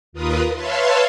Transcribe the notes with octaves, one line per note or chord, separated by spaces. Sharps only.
D#2 F4 A#4 B4 D#6
B4 C#5 E5 F5 A5 C6